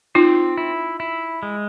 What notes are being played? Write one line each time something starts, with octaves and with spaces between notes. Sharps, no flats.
C4 D#4 F4
E4
E4
G#3